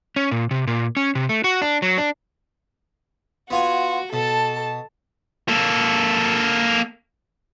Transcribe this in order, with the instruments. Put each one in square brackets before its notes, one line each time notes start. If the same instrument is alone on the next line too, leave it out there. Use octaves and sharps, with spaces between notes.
[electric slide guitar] C#4
A#2
C3
A#2
C#4
C3
A3
F#4
D4
F#3
D4
[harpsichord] B3 F4 G#5 [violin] F#4
[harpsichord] B2 [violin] A4 A5
[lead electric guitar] A#3 A4